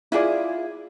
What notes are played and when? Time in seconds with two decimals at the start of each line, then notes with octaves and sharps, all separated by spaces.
0.12 E4 F4 G#4 D5